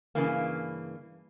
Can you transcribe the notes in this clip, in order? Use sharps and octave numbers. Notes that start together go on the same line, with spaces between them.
G2 C#3 E3 A#3